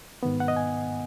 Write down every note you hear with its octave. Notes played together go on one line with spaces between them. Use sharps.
G#2 D#3 B3
F#5
D#5
G#5